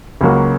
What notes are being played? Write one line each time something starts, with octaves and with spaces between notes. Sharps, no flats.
C#2 C#3 F#3 A#3 F#4